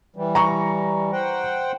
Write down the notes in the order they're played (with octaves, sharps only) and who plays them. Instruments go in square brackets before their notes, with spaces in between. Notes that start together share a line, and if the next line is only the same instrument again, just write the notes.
[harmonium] E3 G3
[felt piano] A#5 C#6
[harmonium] C5 F#5 G5